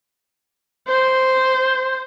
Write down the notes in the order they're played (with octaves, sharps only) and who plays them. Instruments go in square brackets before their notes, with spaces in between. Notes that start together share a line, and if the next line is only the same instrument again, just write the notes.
[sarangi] C5